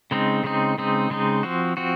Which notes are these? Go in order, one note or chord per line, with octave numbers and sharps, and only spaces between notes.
C#3 G#3 C4 D#4
C#3 G#3 C4 D#4
C#3 G#3 C4 D#4
C#3 G#3 C4 D#4
F3 C4 F#4
F3 C4 F#4